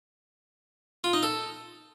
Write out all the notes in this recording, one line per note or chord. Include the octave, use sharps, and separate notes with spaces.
F4
D#4
A4